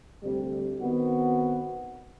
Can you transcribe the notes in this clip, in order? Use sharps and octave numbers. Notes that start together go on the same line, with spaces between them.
D2 C3 G3
D#3 B3 C4 F#4